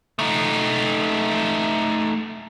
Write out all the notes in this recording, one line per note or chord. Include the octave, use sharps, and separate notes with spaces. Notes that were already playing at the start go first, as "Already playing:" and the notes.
A3 D#4